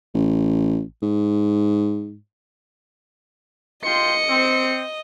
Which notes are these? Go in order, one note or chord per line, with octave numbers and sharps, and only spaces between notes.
A1
G#2
F4 D#5 G5 C6 C#7
C4